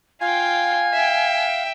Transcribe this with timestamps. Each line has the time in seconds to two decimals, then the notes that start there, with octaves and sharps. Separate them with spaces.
0.21 F4 F5 G5 G#5
0.93 E5 G5